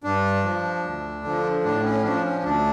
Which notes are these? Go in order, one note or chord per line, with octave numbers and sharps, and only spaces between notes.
G2 D4
F3
D2
D3 F3
A2 D4
C#4
F3 D4
C#4
D2 D4